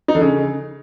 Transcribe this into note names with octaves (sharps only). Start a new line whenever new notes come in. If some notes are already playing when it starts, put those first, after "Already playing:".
D#4
D3
C#3